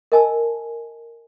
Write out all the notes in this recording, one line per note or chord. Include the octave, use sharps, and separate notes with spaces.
A#4 D#5 G#5 A5 E6